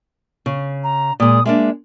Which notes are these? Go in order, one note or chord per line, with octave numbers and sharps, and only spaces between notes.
C#3
A#5
A#2 G#3 D#6
G#3 A#3 D4 E5